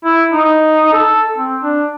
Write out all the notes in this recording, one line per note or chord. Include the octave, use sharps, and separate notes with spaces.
E4
D#4
A4
C4
D4